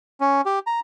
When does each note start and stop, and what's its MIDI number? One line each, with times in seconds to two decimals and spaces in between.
0.20 0.41 61
0.46 0.59 67
0.67 0.80 82